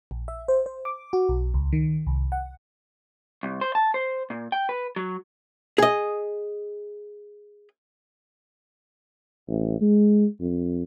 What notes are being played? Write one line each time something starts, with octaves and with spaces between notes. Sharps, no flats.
A#1
E5
C5
C5
D6
F#4
B1
C#2
D#3
C2
F#5
C2
C5
A5
C5
A#2
G5
B4
F#3
G#4 D#5
A1
G#3
F2